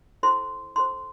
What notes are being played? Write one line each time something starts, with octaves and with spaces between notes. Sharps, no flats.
E4 A4 C5 C6
E4 A4 C5 C6